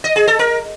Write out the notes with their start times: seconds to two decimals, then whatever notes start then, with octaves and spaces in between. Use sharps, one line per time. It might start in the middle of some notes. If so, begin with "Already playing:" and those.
0.04 D#5
0.16 G#4
0.27 A4
0.39 A#4